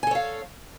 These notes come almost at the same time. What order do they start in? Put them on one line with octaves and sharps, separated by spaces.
G#5 A4 C#5 F5